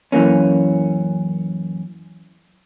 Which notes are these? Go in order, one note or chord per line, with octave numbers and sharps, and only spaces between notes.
F#2 E3 F3 A#3 C#4